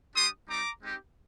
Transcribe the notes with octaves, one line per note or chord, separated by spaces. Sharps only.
G3 D4 G4 C6 D#6
G3 C4 D#4 A#5 D6
G#3 C4 D#4 G4